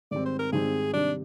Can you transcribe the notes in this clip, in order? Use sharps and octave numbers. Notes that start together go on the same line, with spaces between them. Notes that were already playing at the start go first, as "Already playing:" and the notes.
G#2 D#3 G3 C4 D5
C5
A#4
G#2 D#3 G3 C4 G#4
C3 D#3 G3 D4